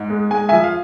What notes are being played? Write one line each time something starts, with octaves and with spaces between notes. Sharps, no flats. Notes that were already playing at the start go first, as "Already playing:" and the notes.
Already playing: G#2
G#3
G#3 G#5
E5 G#5
F3
F5